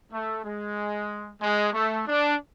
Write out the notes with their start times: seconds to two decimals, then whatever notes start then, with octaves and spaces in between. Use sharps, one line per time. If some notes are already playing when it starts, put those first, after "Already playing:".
0.13 A3
0.44 G#3
1.42 G#3
1.74 A3
2.07 D4